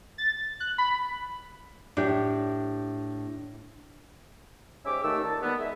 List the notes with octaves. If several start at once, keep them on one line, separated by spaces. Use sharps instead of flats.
A6
F#6
B5
A2 D4 G4
G#2 C#4 G4 E5 D6
D#2 D#3 A3 E6
A#2 A5
D#3 G3 B3
G#3 E5